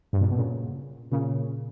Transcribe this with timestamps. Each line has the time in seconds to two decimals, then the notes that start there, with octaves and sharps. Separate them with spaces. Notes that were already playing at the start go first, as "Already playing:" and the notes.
0.13 G2
0.21 A#2
0.30 B2
0.37 A#2 C#3
1.12 A#2 C#3